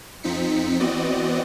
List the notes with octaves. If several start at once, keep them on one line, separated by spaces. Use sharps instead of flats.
F2 F3 C4 D#4 B6 C#7
E3 B3 C4 F#4 D5 D#5